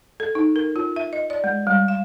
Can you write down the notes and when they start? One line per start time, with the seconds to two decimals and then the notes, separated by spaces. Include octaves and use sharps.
0.20 A4
0.35 D#4
0.56 A#4
0.76 F4
0.96 E5
1.13 D#5
1.30 D5
1.44 G#3
1.67 G3
1.88 F5